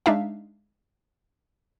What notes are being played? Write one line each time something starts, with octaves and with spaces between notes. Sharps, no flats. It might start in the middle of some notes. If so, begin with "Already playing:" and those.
G#3 D4 D#4 E5 F5